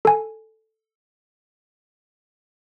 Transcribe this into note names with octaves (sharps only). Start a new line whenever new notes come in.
A4 G#5